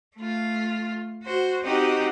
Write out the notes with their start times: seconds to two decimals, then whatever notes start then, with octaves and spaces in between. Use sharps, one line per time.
0.16 A3 F4
1.24 F#4 C5
1.63 C4 D#4 F#4 G4 D#5 F#5